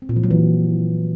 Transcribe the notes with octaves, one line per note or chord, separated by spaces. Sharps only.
C4
A#2
F3
F#3
E3